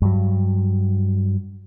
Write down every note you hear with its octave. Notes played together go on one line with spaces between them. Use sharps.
G2 F#3